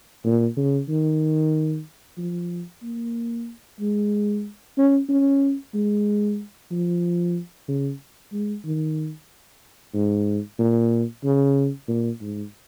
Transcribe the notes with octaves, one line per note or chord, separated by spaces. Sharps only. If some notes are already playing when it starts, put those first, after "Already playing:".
A#2
C#3
D#3
F3
A#3
G#3
C#4
C#4
G#3
F3
C#3
G#3
D#3
G#2
A#2
C#3
A#2
G#2